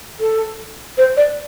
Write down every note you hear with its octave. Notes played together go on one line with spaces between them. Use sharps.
A4
C5
D5